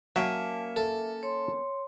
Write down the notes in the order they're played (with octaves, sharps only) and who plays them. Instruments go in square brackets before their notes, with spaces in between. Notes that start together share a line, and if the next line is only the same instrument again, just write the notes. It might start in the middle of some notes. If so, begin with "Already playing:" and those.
[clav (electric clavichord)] F#3 [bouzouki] A#3 C#4 [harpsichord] E5 [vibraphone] A5
[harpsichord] A4 [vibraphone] E5
[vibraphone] C#5 C6